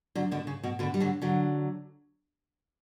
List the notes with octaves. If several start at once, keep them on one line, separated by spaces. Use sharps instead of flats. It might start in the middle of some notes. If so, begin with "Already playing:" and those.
D3 F#3
B2 D3
C#3
B2
B2 D3
G3
D3 F#3
D3 F#3